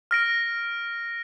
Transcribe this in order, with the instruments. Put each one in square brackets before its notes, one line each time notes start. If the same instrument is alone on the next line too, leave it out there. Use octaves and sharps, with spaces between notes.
[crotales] F6 A#6 D7